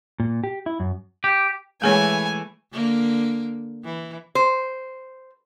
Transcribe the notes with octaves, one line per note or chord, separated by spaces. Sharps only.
A#2
G4
E4
F#2
G4
E3 G#3 A3 G#4 C#5 G#5
D3 A#3
E3
C5